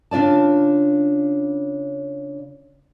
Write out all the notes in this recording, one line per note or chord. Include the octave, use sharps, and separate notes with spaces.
C#3 D4 F4 D5 A5